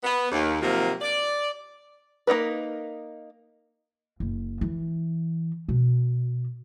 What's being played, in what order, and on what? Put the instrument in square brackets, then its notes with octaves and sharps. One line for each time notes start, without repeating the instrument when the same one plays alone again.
[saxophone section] B3
D#2
C3 D#3 F3 F#3 A#3
D5
[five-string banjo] A#3 D#4 A#4 B4
[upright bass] F#1
E3
B2